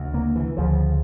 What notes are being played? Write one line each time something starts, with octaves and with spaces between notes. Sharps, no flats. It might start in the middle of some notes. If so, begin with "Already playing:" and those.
Already playing: D2 C#3
A#3
E3
D2 C#3 F3